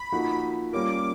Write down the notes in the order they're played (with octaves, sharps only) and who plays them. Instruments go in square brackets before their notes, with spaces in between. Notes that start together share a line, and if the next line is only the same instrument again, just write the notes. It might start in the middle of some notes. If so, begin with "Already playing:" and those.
Already playing: [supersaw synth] B5
[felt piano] F3 A#3 D#4 F#4 A4
[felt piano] G3 A#3 C#4 F4 A#4 [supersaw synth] D6